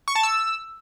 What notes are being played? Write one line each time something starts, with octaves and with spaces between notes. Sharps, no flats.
C#6
A5
E6